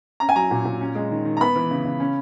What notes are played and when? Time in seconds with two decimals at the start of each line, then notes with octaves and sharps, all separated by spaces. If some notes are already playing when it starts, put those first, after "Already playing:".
0.20 C#4 A#5
0.29 G#5
0.36 F#3 A#5
0.51 A#2
0.65 A#2
0.81 C#4
0.95 G#3
1.11 D#3
1.25 D#3
1.37 A#5
1.41 B3 B5
1.56 E3
1.71 C#3
1.85 C#3
2.00 C#4